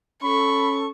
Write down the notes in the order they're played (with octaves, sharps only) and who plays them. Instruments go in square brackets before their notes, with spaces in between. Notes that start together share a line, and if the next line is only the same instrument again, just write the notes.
[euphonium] C#4 [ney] A4 [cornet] B5 [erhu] C#6